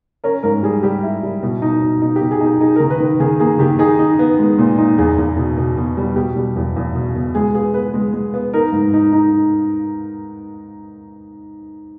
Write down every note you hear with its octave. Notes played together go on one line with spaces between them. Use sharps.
C#4 A#4
G#2 A#4
G3 G#4
G3 G4
E4
G3
B2
D#4
B2
D#4
G4
B2
G#4
D#4 G4
D#4 G#4
D#3 A#4
B4
D#3
D#3 G#4
A#3 G#4
D#3 G4
D#4 G#4
D#4
B3
G#3
A#2
D#4
E2 G#4
E2
B2
B2
B2
G3
B2 G4
G3
E2
E2
B2
B2
G#3 G#4
B3 G#4
B3 B4
G#3
G#3
B3
D#4 A#4
G#2
D#4
D#4